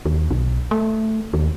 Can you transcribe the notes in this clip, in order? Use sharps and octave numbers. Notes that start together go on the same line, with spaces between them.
D#2
B1
A3
D#2